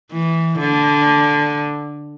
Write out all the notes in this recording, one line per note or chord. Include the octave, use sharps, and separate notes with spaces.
E3
D3